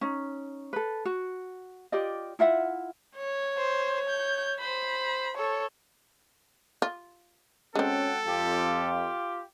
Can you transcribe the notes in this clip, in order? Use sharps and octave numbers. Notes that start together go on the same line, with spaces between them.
C#4 D#4
A4 B4
F#4
F4 G4 D5 D#5
E4 F4 E5 F#5
C#5
C5
G6
C5 B5
A4 C#5
F4
G#3 C4 C#4 F#4 A4 F#5 G5
F2 F4 G4